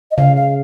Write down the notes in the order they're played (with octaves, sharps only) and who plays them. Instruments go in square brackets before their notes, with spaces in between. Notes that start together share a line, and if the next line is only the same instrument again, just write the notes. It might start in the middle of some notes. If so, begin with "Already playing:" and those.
[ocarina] D#5
[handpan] C#3 [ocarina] F5
[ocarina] F5